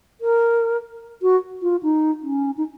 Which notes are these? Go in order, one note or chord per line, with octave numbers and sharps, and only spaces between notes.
A#4
F#4
F4
D#4
C#4
D#4